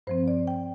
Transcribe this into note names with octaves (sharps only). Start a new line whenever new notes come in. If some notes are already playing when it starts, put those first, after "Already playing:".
G2 F3 C4 C5
D5
G5